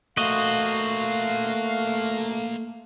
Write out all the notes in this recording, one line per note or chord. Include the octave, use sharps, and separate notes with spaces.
A3 A#3 F#4 C5 D#5 F5